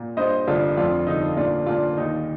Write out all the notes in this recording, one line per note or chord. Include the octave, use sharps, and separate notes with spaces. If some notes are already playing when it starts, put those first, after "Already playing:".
Already playing: A#2
G2 C5 D#5
G1 D4 F4
F2 D4 F4
G1 D#4
A#2 D4 F4
A#2 D4 F4
D#2 D#4